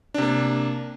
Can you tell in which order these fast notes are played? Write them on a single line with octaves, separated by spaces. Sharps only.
D4 C3 A#3